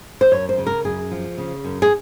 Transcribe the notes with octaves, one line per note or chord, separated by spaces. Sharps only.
C5
F#2 C#5
C5
C#3
A#4
F#2 G#4
F3
C#3
F#2
G#4